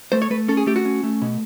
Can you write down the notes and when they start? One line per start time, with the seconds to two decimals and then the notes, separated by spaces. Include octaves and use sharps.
0.12 A3 C5
0.22 C#5
0.30 A3 B4
0.48 C#4 A4
0.57 G#4
0.67 A3 G4
0.76 F#4
0.85 C#4
1.03 A3
1.22 B2